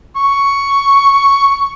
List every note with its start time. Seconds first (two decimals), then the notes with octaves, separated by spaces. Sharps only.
0.16 C#6